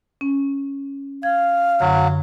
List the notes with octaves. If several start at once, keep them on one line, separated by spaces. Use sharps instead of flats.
C#4
F5 G#6
F#2 D3 F#3